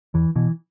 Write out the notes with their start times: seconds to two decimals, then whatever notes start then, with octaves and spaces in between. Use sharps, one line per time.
0.14 E2 E3
0.36 B2 E3